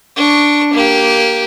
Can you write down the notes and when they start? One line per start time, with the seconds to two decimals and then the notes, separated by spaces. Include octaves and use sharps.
0.16 D4 C#6
0.73 A#3 G4